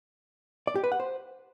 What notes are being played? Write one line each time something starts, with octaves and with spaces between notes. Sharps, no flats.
D5
G4
B4
F#5
C5